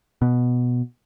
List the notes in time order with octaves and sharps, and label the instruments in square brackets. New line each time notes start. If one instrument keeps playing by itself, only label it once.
[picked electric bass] B2